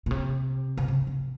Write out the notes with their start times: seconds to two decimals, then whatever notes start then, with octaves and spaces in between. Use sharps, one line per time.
0.06 A#2
0.11 C3
0.77 C3
0.88 C#3
1.07 C3